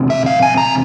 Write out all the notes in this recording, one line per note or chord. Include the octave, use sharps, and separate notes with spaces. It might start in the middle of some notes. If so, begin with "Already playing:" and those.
Already playing: E2 C3
E5
F5
G#5
A#5